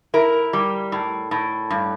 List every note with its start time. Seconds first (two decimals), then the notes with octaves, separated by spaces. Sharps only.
0.14 E4 A#4
0.53 G3
0.92 A2
1.31 A2
1.70 G2